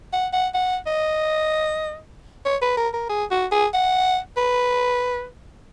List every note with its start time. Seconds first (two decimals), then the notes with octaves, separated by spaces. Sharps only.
0.13 F#5
0.33 F#5
0.54 F#5
0.86 D#5
2.45 C#5
2.62 B4
2.77 A#4
2.94 A#4
3.09 G#4
3.31 F#4
3.52 G#4
3.74 F#5
4.37 B4